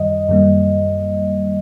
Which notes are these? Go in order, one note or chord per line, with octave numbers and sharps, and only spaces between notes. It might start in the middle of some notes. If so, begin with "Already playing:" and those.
Already playing: F#2 D#3 G3 D#5
F#2 D#3 G3 A#3